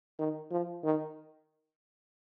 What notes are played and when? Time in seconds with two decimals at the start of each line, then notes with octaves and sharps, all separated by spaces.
0.19 D#3
0.51 F3
0.84 D#3